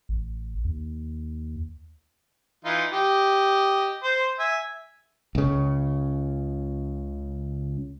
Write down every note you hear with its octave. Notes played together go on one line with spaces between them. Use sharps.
A1
D#2
E3 D#4 F4
G4 D#5
C5
E5 G#5
C#2 C#3